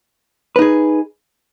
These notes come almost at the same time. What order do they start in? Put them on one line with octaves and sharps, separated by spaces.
B4 D#4 G#4